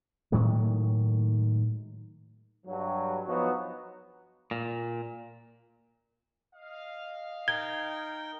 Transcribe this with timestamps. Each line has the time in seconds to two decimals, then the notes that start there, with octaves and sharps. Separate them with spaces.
0.32 A2 D#3 F#3 G#3
2.66 G2 F#3
3.25 F3 F#3 B3 D#4 F#4
4.51 A#2
6.55 D#5 F5
7.48 D#4 A#4 G5 G#6 G7